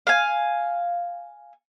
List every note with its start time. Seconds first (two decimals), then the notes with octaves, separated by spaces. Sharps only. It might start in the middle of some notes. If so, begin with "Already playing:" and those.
0.07 F5 G#5